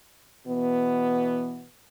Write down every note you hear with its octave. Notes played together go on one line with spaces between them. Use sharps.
B2 E3 B3